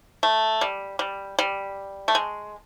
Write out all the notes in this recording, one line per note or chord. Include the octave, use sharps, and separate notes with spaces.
A3
G3
G3
G3
A3
G#3